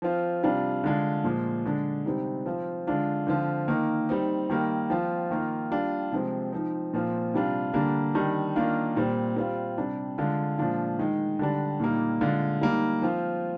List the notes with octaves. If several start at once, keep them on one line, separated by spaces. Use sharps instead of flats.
F3 C4 F4
C3 G3 D4 F4
D3 G#3 D4 F4
A#2 F3 G#3
D3 G#3 D4
C3 G3 C4 D#4
F3 C4 F4
D3 G#3 D4 F4
D3 F3 C4 F4
D#3 A#3 D#4
G3 C4 D#4
D#3 G3 A#3
F3 C4 F4
D#3 A#3 F4
G3 D4 F4
C3 F3 G#3 C4
F3 C4 D#4
A#2 F3 C4 F4
C3 G3 D4 F4
D3 G3 A#3 D4
D#3 G3 D4
D#3 A#3 D4 F4
A#2 G3 C4
G3 C4 F4
C3 G3 D4
D3 G#3 D4 F4
A#2 F3 G#3 D4 F4
D#3 G#3 D#4
D3 G3 D4
A#2 G3 A#3 D#4
D3 G#3 D4 F4
G3 A#3 D#4
F3 C4 F4